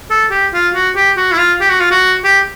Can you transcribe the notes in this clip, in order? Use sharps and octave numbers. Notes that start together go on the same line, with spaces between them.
A4
G4
F4
F#4
G4
F#4
E4
F4
G4
F#4
F4
F#4
G4